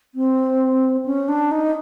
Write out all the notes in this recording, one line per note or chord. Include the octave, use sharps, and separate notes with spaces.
C4
C#4
D4
D#4